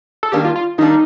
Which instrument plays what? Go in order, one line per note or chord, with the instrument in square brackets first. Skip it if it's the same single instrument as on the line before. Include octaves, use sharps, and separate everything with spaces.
[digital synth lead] A4
[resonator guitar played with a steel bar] D#3 G3 A#3 D4 [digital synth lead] G4
[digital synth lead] F4
F4
[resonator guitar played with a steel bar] D#3 G3 A#3 D4 [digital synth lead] D#4